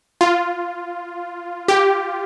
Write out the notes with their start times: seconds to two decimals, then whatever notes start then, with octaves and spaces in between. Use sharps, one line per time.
0.21 F4
1.68 G4